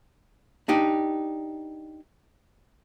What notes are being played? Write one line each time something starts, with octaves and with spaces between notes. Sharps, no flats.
D4 D#4 G4